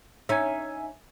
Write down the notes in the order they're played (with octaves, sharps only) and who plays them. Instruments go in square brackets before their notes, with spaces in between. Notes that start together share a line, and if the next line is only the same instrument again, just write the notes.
[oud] C#4 D#4 [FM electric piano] E5 G#5